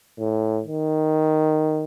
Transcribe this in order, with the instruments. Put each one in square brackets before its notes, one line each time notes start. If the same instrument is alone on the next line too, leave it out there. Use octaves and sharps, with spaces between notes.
[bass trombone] A2
D#3